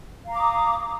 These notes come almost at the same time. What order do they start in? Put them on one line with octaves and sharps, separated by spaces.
F5 A#5 D6 D#6